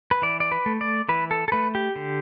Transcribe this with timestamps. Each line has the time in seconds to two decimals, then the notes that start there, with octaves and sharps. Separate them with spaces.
0.11 B4
0.22 E3 D5
0.40 D5
0.52 B4
0.66 A3
0.81 D5
1.09 E3 B4
1.31 A4
1.48 A4
1.52 A3 B4
1.75 G4
1.96 D3